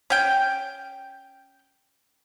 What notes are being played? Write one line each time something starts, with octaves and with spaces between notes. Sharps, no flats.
C#4 G5